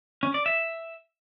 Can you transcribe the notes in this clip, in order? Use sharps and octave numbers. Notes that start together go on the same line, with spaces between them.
C#4
D5
E5